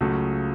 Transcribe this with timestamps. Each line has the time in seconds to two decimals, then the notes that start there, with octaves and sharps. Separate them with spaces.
0.01 C#2 C#3 F#3 A3